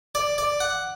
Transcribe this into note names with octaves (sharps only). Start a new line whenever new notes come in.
D5
D5
F#5